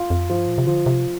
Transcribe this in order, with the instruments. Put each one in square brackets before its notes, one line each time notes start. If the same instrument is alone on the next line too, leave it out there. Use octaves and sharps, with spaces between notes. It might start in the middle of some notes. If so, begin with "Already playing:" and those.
Already playing: [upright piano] F4
[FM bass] F2
[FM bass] G2 [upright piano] F3
[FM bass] A#2
C3
[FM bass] D3 [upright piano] F3
[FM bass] C3